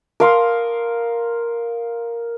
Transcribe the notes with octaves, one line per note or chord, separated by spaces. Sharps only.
A#4 F5 C6 D#6